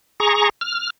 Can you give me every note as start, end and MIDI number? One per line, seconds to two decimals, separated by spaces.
0.20 0.49 68
0.20 0.49 82
0.20 0.49 85
0.61 0.90 89